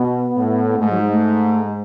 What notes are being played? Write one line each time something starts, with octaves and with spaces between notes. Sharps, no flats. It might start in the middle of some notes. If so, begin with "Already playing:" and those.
Already playing: B2 B3
A2
G#2 A3
F#3
G#3
A3
G#3